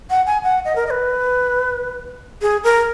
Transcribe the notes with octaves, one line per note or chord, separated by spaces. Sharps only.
F#5
G#5
F#5
D#5
A#4
D#5
B4
G#4
A#4